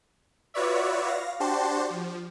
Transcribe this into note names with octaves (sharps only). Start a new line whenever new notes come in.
F4 F#4 B4 C#5 D5 E5
F5 A#6
D4 F#4 G4 C5 A5 C6
F3